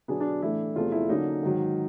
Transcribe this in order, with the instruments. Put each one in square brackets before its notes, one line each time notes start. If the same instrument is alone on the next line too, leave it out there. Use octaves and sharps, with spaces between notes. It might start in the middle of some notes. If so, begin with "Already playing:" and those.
[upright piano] B2 F#3 B3 D4 G#4
D4
A2 E3 A3 D4 E4
E2 C3 F3 A3 F4
E4
D3 F#3 A#3 C#4 D#4
G#2 D#3 F#3